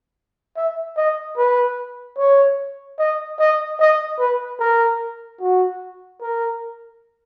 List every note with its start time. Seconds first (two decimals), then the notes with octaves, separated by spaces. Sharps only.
0.57 E5
0.97 D#5
1.37 B4
2.18 C#5
2.99 D#5
3.39 D#5
3.79 D#5
4.19 B4
4.60 A#4
5.41 F#4
6.21 A#4